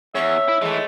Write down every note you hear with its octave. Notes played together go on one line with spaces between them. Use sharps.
E2 C#5 E5
E4
E3 G#3 A3